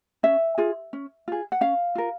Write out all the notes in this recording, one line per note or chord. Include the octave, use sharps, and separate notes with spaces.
C#4 E5
F4 G#4
C#4
F4 G#4
F#5
C#4 F5
F4 A#4